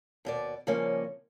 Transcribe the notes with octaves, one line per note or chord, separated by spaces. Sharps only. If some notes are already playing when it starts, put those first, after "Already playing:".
D#2 B2 D5
C#3 F3 G3 A#3 C#4